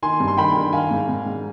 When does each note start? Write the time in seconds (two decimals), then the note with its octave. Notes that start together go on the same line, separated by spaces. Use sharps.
0.02 D#3 G#5 C6
0.20 G2
0.28 C6
0.37 D#3 G5 B5
0.56 D#3
0.73 D#3 F5 G#5
0.91 G#2
1.09 G#2
1.26 G#2